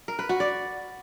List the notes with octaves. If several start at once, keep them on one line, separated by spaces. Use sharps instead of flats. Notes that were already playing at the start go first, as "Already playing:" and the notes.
A#4
B4
F#4
D5